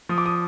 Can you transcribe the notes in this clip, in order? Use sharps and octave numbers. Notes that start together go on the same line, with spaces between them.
F3 D#6
D6
D#6